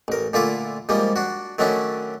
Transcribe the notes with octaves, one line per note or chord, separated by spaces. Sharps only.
A1 A#4
A#2 D3 A3 E4 F4 D6
G#2 F3 G3 A#3
D4 F#4
D#3 F#3 A3 C#4 D4 E4